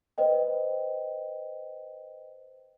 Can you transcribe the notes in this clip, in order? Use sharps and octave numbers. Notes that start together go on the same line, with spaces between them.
B4 C5 D#5 G5